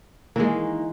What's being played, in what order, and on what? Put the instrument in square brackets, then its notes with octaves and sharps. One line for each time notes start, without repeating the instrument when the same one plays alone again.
[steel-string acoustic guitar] D#3 A#3 [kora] E3 G#3